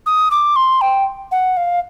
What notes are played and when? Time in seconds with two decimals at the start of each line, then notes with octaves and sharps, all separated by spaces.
0.06 D#6
0.31 D6
0.56 C6
0.81 G5
1.32 F#5
1.57 F5